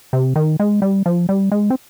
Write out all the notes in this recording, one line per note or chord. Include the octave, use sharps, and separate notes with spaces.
C3
D#3
G#3
G3
F3
G3
G#3
C4